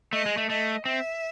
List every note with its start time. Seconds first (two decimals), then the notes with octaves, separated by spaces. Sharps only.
0.13 A3 D#5
0.26 G#3
0.37 A3
0.49 A3 D#5
0.85 C4 E5